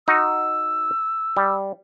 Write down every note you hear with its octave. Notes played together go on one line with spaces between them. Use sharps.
D#4 F#4 E6
G3